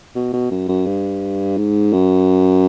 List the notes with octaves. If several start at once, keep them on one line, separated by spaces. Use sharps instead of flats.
B2
B2
F#2
F#2
G2
G#2
F#2